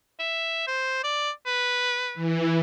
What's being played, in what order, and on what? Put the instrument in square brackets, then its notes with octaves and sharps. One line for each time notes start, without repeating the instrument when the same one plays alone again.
[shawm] E5
C5
D5
B4
[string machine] E3